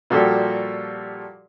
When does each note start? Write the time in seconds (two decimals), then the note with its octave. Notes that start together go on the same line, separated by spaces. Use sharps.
0.10 A#2 F3 G3 F#4 G4 A4